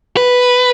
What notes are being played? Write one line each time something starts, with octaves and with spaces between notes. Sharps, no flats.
B4